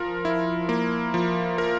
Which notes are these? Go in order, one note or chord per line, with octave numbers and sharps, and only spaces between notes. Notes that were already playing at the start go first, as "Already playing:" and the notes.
Already playing: F3 A#4
E4
A#3
F3
A#4